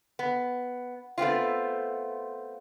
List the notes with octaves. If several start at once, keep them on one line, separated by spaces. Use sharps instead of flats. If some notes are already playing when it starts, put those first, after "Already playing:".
B3
A3 B3 C4 F4